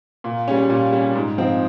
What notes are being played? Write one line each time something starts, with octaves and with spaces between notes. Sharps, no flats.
A#2
G3 C#4
A#2
G3 C#4
G#2
F3 C4 D#4